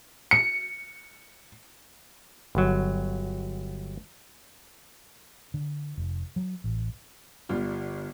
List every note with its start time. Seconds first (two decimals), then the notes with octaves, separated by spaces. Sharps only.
0.31 C#7
2.55 G1 F#3
5.54 D3
5.97 F1
6.36 F#3
6.64 A1
7.49 G1 G3 F4